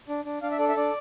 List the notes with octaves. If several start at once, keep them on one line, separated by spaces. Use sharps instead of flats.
D4
D4
D4 F5
E5
A4 D5
E5
D4 D5